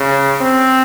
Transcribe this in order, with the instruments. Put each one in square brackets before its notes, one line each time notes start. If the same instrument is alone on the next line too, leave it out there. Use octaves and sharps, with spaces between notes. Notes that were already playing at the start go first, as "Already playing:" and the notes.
Already playing: [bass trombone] C#3
C4